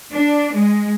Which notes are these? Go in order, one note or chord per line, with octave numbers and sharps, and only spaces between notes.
D4
G#3